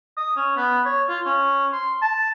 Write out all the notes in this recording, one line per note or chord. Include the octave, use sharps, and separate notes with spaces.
D#6
C#4
B3
C#5
F4
C#4
C6
A5